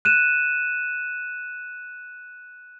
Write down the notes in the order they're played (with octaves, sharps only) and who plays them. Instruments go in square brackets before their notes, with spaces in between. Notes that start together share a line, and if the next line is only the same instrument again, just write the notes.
[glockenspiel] F#6 D#7 E7